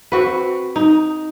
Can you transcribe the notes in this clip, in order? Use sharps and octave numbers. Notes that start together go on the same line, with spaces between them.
C4 F#4 B4
D#4